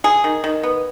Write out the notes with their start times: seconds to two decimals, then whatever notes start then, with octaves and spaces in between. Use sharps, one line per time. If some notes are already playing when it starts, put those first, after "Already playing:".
0.04 F#3 G#4
0.24 D#3
0.44 D#3
0.63 B3